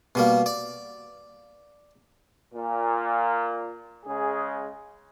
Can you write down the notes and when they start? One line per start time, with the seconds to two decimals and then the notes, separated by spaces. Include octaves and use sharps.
0.15 B2 G3 A#3
0.46 D5
2.54 A#2
4.06 C#3 G#3 G#4